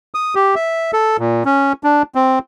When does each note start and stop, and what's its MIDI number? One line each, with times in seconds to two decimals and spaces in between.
0.14 0.35 87
0.35 0.55 67
0.55 0.91 76
0.93 1.17 69
1.19 1.43 46
1.45 1.73 61
1.84 2.03 62
2.15 2.39 60